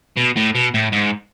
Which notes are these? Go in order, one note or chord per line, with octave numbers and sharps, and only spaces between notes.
B2
A2
B2
A2
G#2